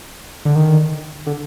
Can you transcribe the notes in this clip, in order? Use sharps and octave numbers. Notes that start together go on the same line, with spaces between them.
D3
D#3
D3